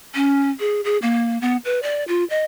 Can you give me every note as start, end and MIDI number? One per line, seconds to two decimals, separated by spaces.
0.15 0.50 61
0.60 0.81 68
0.84 0.98 68
1.02 1.40 58
1.41 1.57 59
1.65 1.80 71
1.83 2.04 74
2.08 2.24 65
2.30 2.44 75